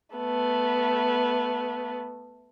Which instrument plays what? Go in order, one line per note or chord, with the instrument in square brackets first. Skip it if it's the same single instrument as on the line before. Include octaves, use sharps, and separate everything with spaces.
[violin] A3 B3